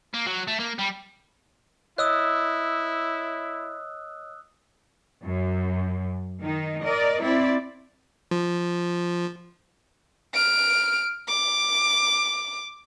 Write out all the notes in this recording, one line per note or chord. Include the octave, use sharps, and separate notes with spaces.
A#3
F#3
A3
A#3
G3
E4 C#5 D#5 D#6 E6 F#6
F#2
D#3 D#4
A#4 D5 D#5
C4 E4 D5
F3
F6 D7
D6